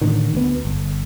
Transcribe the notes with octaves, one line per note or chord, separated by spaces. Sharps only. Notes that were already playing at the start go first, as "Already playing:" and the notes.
A2 D3 D#3
D2 B3
G1